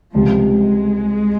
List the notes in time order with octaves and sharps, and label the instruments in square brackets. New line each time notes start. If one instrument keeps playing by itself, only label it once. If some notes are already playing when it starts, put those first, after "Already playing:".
[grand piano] C#2 C3 G3 [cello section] F3
[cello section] G#3